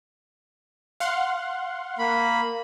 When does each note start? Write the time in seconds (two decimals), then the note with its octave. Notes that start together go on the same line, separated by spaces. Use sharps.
1.00 F5 F#5 C6
1.99 A#3 B5